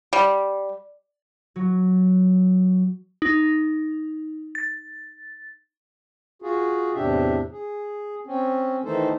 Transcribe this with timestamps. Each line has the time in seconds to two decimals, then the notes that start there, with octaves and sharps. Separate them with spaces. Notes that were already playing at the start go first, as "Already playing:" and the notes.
0.13 G3
1.56 F#3
3.22 D#4
4.55 A6
6.42 F4 F#4 G#4
6.95 E2 A2 C3 D4 G4 E5
7.52 G#4
8.27 C4 C#4
8.85 D#3 E3 A3 D#4 A4 C5